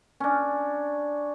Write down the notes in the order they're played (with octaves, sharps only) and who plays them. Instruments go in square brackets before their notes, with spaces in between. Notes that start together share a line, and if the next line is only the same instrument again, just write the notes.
[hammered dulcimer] C#4 D4